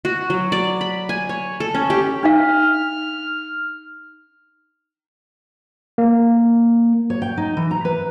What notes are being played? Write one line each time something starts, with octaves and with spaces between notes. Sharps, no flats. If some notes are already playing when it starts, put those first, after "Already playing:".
F#4
F#3
D5
B5
G#5
C#5
A4
C#4
G4
D4 D#4 F5 F6
A#3
C#5
G5
D#4
E3
A#5
B4